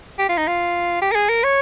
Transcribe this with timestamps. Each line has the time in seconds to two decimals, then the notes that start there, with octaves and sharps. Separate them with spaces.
0.18 G4
0.29 F4
0.37 D#4
0.47 F4
1.02 G4
1.11 A#4
1.15 G#4
1.29 A#4
1.44 C#5